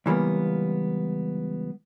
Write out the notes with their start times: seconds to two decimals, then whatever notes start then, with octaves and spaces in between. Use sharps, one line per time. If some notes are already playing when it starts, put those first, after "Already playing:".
0.06 C#2 E3 G3 A#3 B3